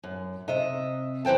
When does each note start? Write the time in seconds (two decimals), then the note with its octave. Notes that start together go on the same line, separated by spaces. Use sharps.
0.03 F#2
0.48 C3 D#5 E5
1.25 F#2 E3 C5 G5 A5